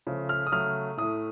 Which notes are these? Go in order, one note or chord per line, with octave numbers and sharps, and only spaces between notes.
C#3 F3 A3
F6
D#6
C#3 F#3 A3 F6
A2 A3 D#6